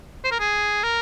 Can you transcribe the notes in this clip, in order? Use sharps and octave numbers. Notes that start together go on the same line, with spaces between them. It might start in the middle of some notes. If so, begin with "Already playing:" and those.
C5
A#4
G#4
A#4